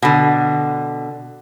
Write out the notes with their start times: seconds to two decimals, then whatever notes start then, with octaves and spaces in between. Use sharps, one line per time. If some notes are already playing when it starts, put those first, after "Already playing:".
0.02 B2 D3